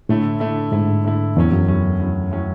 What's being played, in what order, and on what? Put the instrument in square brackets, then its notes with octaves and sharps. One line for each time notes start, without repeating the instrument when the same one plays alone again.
[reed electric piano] A2 [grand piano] D3 A3 E4
[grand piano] D3 A3 E4
[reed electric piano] G#2 [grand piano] D3 A3 E4
[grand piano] D3 A3 E4
[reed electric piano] E2 [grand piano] A2 F#3 C#4
[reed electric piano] F#2
[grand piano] A2 F#3 C#4
A2 F#3 C#4
A2 F#3 C#4